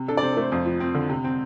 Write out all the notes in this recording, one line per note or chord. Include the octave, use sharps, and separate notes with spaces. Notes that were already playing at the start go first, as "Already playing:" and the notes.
Already playing: C3
D4 A4
D5
C3 C5
A4
A3 C5
F2 C5
F3
C4
D3
C3
C4